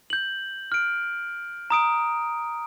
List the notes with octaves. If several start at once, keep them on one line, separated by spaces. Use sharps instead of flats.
G6 F#7
F6 D7
A#5 D#6 D7